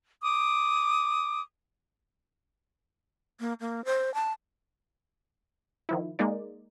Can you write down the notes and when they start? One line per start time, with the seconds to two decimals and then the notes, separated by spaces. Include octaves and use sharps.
0.22 D6 D#6
3.40 A#3
3.60 A#3
3.85 C5
4.14 A5
5.89 D#3 F3 E4
6.19 G#3 A#3 D#4 D5